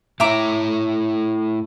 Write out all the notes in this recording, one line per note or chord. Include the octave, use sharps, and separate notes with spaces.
A2 E4 C#5 E5 A#5 D6